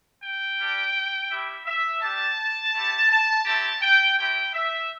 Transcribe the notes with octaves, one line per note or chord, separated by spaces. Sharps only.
G5
G3 D4 G4
G3 E4 G4 E5
E5
G3 D4 G4 A5
A3 E4 G4
A5
A3 C4 E4 G4 A5
G5
A3 C4 E4 G4 G5
E5